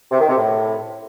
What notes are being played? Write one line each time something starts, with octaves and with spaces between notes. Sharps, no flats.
C3
D#3
C3
A2